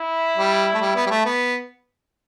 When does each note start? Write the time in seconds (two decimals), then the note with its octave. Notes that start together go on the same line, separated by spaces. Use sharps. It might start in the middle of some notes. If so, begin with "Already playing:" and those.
Already playing: E4
0.37 G3
0.75 A3
0.81 G3
0.96 B3
1.07 G3
1.10 A3
1.25 B3